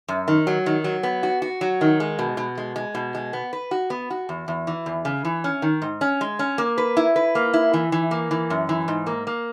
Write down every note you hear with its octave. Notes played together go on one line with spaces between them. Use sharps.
F#2
D#3
F#3
D#3
F#3
B3
F#4
F#4
F#3
D#3
G#3
B2
B2
G#3
G#3
B2
G#3
B3
B4
F#4
B3
F#4
E2
E2
E3
E2
C#3
E3
C#4
D#3
G#2
C#4
G#3
C#4
A#3
B4
E4
B4
A#3
E4
E3
E3
A#3
E3
F#2
E3
G#2
A#3
A#3